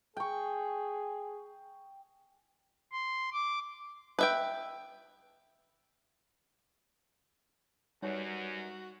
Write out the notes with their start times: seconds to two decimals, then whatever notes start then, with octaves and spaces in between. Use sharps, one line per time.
0.17 G#4 G5 C#6
2.92 C6
3.33 D6
4.19 B4 E5 G5
8.02 F#2 G3 D#4 F#4 B4 C#5 D5 G#5